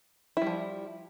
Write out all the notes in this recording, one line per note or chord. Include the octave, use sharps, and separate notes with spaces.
F3 G3 E4